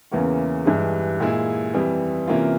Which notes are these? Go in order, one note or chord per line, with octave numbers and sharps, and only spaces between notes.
E2 C#3 E3 A#3 C#4
G2 E3 G#3
A#2 G#3 E4 G#4
F2 E3 G3
C3 E3 A#3 C#4 F4